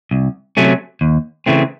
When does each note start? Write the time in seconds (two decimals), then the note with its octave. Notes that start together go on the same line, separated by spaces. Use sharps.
0.11 C2
0.57 C3 F#3 A3 C#4
1.01 D#2
1.46 C#3 E3 A3 C4